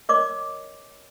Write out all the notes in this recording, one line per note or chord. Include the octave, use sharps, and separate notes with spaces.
A#4 C#5 D#5 D6